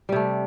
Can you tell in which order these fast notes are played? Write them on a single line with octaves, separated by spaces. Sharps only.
G3 C3 A3